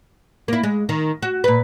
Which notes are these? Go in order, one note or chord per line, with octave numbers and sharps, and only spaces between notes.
A#3 E4
G#3
D#3
F#4
A#2 B4